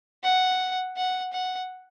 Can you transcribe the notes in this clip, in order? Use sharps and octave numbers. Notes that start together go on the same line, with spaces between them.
F#5
F#5
F#5